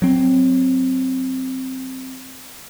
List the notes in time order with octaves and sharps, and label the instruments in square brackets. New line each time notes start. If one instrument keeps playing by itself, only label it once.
[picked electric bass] F#3 C4